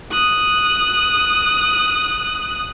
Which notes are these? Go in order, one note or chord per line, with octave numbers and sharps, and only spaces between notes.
D#6 F#6